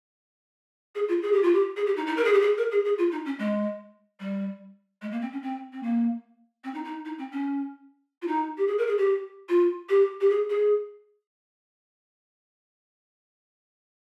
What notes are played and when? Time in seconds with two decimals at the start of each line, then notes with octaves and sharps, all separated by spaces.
0.95 G#4
1.08 F4
1.23 G#4
1.33 G4
1.43 F4
1.54 G4
1.76 G#4
1.86 G4
1.97 D#4
2.07 D#4
2.17 A#4
2.25 G#4
2.33 G4
2.41 G#4
2.58 A#4
2.71 G#4
2.85 G#4
2.98 F4
3.12 D#4
3.25 C#4
3.39 G#3
4.20 G3
5.02 G#3
5.12 A#3
5.22 C4
5.32 C#4
5.43 C4
5.73 C4
5.83 A#3
6.64 C4
6.74 D#4
6.84 D#4
7.05 D#4
7.18 C4
7.32 C#4
8.22 F4
8.27 D#4
8.58 G4
8.68 G#4
8.78 A#4
8.87 G#4
8.98 G4
9.49 F4
9.89 G4
10.21 G4
10.30 G#4
10.50 G#4